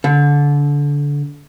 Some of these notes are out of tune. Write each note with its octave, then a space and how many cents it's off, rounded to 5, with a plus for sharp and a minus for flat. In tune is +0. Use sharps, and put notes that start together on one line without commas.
D3 -25